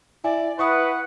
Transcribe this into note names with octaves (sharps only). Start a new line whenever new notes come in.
E4 D5 G#5
E4 B4 F#5 C#6 D#6